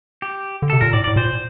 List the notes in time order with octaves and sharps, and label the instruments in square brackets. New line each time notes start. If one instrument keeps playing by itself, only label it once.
[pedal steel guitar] G4
[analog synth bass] D3
[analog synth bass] C3 [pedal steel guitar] A4
[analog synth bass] A#2 [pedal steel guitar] A#4
[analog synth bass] A2 [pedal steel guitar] D5
[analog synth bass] A2 [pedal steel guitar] D5
[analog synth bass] A#2 [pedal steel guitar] C5